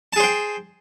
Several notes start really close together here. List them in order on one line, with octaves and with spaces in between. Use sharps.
A5 G#4 C5 G5